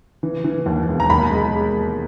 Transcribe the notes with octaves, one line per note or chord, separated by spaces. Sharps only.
E3
E3
D#2
E1
A#5
D#2 B5
G#3